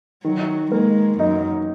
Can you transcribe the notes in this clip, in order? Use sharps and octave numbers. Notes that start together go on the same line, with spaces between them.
D#3 F#3
G#3 A#3
F#2 D#4